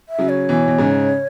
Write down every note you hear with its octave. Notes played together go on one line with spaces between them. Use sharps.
E5
C#3 F#3
C#5
B2 E3
B2
G#2 C#3